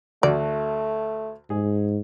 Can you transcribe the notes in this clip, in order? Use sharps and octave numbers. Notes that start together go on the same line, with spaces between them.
D2 A3 F#4 D5
G#2 G#4